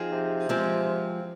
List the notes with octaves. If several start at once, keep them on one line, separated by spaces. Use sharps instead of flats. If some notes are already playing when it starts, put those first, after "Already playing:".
Already playing: F3 C4 D#4 G#4 C5
C3
F3 G#3 C4